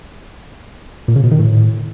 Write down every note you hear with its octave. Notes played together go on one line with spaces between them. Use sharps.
A#2
C#3
B2
D#3
A2